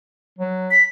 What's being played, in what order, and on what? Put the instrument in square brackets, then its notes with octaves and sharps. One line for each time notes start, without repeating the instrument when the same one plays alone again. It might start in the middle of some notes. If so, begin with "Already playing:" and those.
[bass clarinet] F#3
[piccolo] B6